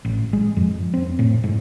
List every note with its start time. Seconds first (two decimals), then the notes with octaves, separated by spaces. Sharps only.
0.05 A1
0.33 G#3
0.57 F2
0.94 C4
1.19 A2
1.44 G#2